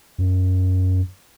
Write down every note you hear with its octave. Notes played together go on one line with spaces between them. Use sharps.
F#2